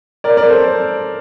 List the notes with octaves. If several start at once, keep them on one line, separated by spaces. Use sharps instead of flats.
A#4 D5
A#4 D5
A4 C5